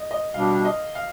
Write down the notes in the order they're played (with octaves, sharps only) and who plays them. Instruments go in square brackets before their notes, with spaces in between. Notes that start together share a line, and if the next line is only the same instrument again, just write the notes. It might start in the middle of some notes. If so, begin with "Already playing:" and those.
Already playing: [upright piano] D#5
D#5
[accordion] B2 G3 D4 [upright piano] F5
[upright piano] D#5
F5